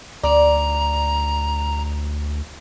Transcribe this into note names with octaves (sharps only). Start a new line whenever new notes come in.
D2 D5 A#5